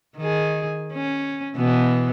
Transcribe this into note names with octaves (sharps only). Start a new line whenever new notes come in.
D#3 G#4
C#4
B2 E3 B3